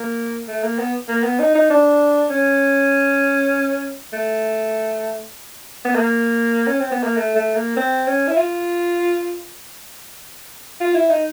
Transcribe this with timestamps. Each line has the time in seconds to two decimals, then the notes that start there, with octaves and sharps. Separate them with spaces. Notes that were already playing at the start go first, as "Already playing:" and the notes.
Already playing: A#3
0.48 A3
0.63 A#3
0.79 B3
1.08 A#3
1.24 B3
1.40 D#4
1.55 D#4
1.70 D4
2.30 C#4
4.13 A3
5.85 B3
5.95 A#3
6.67 C#4
6.80 C4
6.92 B3
7.03 A#3
7.16 A3
7.35 A3
7.56 A#3
7.77 C4
8.07 C#4
8.27 E4
8.37 F4
10.80 F4
10.95 E4
11.10 D#4